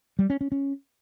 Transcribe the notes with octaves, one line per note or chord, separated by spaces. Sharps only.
G3
C#4
C#4
C#4